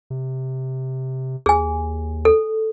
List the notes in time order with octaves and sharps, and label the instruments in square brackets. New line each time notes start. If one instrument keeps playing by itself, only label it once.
[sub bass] C3
[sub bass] D#2 [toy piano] G#4 G#5
[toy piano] A4